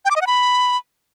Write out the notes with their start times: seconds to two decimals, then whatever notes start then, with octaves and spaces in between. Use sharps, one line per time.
0.05 G5
0.10 D6
0.16 D#5
0.21 F#5
0.27 B5